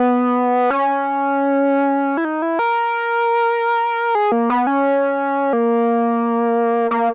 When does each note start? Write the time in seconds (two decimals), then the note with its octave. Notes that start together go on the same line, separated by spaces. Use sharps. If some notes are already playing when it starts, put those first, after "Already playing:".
Already playing: B3
0.70 C#4
2.17 E4
2.25 D#4
2.42 E4
2.59 A#4
4.15 G#4
4.32 A#3
4.50 B3
4.67 C#4
5.53 A#3
6.91 A#3